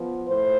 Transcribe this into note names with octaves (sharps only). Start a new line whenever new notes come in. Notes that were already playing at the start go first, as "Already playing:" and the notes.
Already playing: F3 B3
A2 C5